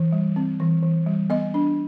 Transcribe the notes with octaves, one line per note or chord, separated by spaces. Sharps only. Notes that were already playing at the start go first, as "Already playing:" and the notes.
Already playing: E3
G3
C4
E3
E3
G3
B3 D#5
D4